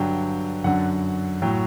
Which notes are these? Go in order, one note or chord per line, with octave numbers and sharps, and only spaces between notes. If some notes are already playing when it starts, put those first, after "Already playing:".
Already playing: G2 D3 F#3 G5
F#2 D3 F#3 F#5
A2 F#3 G5